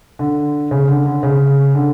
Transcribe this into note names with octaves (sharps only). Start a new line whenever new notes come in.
D3
C#3
D3
D3
C#3
D3